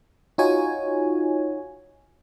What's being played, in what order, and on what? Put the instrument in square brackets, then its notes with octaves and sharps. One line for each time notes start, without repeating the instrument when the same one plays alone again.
[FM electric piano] D#4 F4 F#4 C#5 G#5